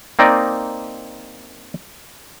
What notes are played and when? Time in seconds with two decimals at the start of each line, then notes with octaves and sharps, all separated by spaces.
0.19 A#3 C4 D#4 D5 D#5